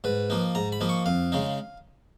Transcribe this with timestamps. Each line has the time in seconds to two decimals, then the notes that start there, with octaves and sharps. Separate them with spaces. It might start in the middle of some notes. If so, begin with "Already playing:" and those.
0.04 G#2 B4
0.30 F3 A#3 D#4
0.55 G#2 A#5
0.72 B5
0.81 F3 A#3 D#4
0.89 C#6
1.06 F2 F5
1.32 C#3 G#3 D#4